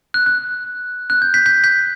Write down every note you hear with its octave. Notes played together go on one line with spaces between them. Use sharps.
F#6
F#6
F#6
G6
G6 B6
G6 B6
G6 B6